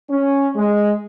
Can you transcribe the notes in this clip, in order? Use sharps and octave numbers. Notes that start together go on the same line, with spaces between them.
C#4
G#3